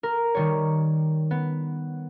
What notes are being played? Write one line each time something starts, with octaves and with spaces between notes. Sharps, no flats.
A#4
D#3 G3 C#5
B3